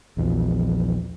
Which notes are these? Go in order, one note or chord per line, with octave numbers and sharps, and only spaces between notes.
A#1 E2 F3